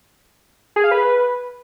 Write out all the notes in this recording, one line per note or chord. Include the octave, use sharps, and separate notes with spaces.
G#4
F5
B4